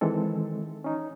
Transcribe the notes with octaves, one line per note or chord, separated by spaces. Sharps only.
D#3 E3 G#3 C4 A4
C#4 D#4